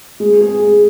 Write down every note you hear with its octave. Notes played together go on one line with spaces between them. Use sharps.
G#3
G#4
G#3